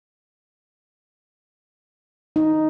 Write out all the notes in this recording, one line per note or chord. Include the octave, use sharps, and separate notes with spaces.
D#4